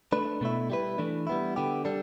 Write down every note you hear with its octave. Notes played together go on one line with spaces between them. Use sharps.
A3 D4 B4
B2 A3 E4
G3 E4 B4
E3 A3 D4
G3 B3 E4
D3 B3 G4
G3 D4 A4